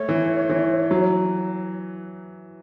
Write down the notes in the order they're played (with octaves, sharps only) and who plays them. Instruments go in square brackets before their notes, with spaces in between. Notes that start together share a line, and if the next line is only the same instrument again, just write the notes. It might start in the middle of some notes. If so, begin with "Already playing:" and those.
Already playing: [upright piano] A3 [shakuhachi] C#5
[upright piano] E3
E3
F#3